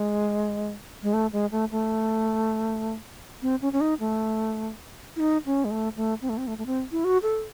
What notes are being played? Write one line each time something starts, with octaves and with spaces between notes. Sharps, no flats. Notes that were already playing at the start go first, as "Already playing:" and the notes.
Already playing: G#3
G#3
A3
G#3
A3
A3
C4
C#4
C#4
D#4
A3
E4
D#4
C#4
G#3
A3
A3
C4
A3
C4
A3
A3
C4
E4
F#4
A4